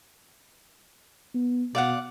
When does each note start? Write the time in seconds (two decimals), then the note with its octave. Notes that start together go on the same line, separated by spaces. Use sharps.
1.34 B3
1.75 B2 D5 F5 F#5